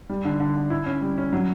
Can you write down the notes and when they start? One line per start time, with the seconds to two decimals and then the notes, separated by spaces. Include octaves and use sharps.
0.09 G3
0.25 D3
0.40 D3
0.56 D3
0.70 E4
0.86 C#4
1.02 G3
1.18 C#4
1.33 F#3